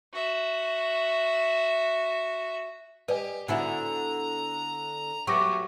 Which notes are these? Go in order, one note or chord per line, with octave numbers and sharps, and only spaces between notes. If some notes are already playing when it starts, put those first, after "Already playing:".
F#4 E5
G4 B4 D5 D#5 G#5
D3 B3 E4 F#4 G#5 A#5
F#3 A3 B3 G4 C#6 D6 A#6